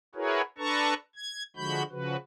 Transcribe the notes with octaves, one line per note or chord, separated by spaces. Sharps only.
E4 F#4 G#4 A#4 B4 C#5
D4 A4 B4 A5 A#5 C#6
G#6
D3 F3 G#3 F#4 B5 G6
C#3 F3 F#4 B4